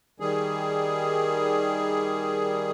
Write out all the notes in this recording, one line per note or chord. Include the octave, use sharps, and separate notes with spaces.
D#3 G3 G#4